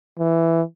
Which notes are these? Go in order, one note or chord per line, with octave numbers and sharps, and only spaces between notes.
E3